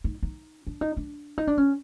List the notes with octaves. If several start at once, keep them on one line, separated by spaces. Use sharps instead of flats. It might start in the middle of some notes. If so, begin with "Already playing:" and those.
D#4
D#4
D4
D#4
D4
D#4
D4
C#4